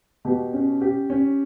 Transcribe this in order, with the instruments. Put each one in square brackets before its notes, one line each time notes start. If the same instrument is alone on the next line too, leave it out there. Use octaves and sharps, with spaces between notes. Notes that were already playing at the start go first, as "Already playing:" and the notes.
[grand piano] B2 [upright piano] G4
[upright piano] C#4
G4
C#4